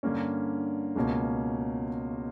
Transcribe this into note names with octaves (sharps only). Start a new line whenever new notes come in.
G2 D3 A#3 C#4
C#2 B2 A#3 C#4